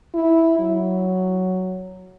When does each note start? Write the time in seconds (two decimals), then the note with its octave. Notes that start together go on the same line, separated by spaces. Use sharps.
0.14 E4
0.59 F#3